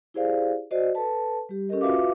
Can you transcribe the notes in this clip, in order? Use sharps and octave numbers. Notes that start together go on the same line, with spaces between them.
E4 G4 G#4 C5 D5 F5
F#4 C5 D5 D#5
A4 B4 A5
G3 G4
C#4 G4 A4 A#4 D#5
F4 F#4 B4 E5 F5 D6